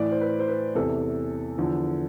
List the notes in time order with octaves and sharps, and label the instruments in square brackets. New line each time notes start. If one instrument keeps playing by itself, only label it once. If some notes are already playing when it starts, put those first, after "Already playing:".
Already playing: [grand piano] A2 E3 D5
C5
B4
C5
B4
E2 C3 E3 A4
E2 D3 F3